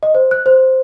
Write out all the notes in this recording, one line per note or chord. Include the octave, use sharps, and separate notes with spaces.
D#5
C5
F#6
C5